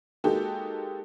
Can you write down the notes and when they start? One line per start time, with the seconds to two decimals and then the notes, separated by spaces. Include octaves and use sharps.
0.24 G#3 A#3 D#4 F#4 G4 A4